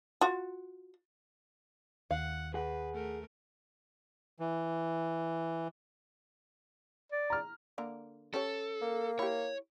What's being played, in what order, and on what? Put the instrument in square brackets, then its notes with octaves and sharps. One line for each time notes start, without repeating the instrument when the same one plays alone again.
[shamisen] F4 F#4
[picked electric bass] D#2 [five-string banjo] F5 [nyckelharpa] F#5
[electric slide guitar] G#4 F#5 [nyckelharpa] B4
[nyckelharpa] A3 A#4
[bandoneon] E3
[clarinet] D5
[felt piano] A#5 F6
[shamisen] D3 A#3 A#5
[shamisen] C#4 G4 C#5 [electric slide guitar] A4
[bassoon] A#3
[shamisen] E4 G4 [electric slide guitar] C#5